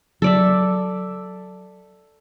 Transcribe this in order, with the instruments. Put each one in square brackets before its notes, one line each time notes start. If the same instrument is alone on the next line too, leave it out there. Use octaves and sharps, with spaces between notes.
[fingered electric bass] F#3 [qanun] A4 D5 E5